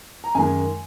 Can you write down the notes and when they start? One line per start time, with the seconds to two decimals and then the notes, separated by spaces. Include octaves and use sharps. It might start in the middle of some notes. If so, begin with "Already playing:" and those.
0.24 A#5
0.35 F#2 D#3 G#3 G#5